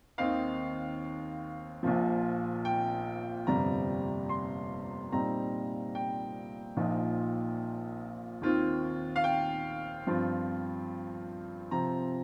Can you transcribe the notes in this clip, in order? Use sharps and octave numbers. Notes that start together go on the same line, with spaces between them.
D#2 D#3 C4 D#4 F5
A#1 A#2 F3
G5
G1 F2 C3 G3 A#5
C6
A#2 G3 C4 D#4 A#5
G5
A#1 A#2 F3 D#4
D#2 D#3 C4 F4
F5
G5
G2 F3 C4 F4
C3 F3 C4 A#5